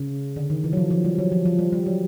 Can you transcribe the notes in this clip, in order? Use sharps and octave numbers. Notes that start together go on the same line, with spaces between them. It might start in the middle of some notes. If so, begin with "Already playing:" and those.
Already playing: C#3
D3
D#3
E3
F#3
F3
F3
G3
F#3
F3
F3
G3
G3
F#3